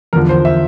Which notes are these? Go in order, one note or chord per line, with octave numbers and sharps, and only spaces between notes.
E2 D3 F3 A#4
C5
E5